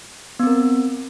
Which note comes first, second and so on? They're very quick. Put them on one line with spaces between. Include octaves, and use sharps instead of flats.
B3 C4 A#4